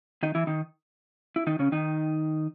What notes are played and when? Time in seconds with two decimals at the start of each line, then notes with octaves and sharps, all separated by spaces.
0.23 D#3 D#4
0.35 E3 E4
0.47 D#3 D#4
1.36 E4
1.47 D#3 D#4
1.59 C#3 C#4
1.72 D#3 D#4